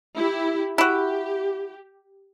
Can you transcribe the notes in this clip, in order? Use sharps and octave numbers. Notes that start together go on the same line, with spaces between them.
E4 G4
E4 F#4 G4